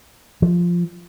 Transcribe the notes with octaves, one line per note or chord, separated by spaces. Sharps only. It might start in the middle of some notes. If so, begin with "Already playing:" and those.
F3